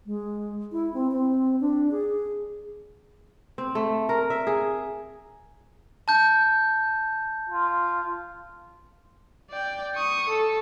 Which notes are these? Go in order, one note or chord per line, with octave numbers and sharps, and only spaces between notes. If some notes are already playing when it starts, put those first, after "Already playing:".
G#3
E4
C4
C4
D4
G#4
C4
A3
A#4
E5
G#4
A5 G6
F4
D5 G5
C#6 D#6
A4